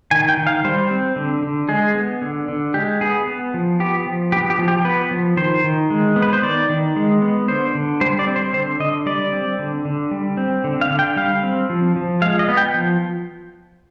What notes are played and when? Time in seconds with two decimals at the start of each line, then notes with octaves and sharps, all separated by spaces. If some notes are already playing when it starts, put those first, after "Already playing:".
0.11 D#3 G#5
0.29 G5
0.37 D#3
0.47 F5
0.64 G3 C5
0.90 C4
1.16 D3
1.43 D3
1.69 G#3 G#4
1.95 B3
2.22 D3
2.48 D3
2.74 G#3 G4
3.01 B3 G#4
3.27 B3
3.54 F3
3.80 B3 G4
4.06 F3
4.32 B3 G4
4.50 G4
4.59 F3
4.68 G4
4.84 B3 B4
5.11 F3
5.37 D#3 C5
5.64 D#3
5.90 G#3
6.16 B3
6.22 B4
6.33 C5
6.43 D#3 D5
6.69 D#3
6.96 G#3
7.22 B3
7.48 D3 C5
7.75 D3
8.01 G3 C5
8.19 D5
8.27 C4
8.36 C5
8.54 D3 C5
8.80 D3 D#5
9.06 G3 D5
9.32 C4
9.59 D3
9.85 D3
10.11 G3
10.37 C4
10.64 D3
10.81 F5
10.90 D3
10.99 G5
11.16 G3 F5
11.43 C4
11.69 F3
11.96 F3
12.22 G#3 F5
12.39 D#5
12.48 B3
12.57 G5
12.74 F3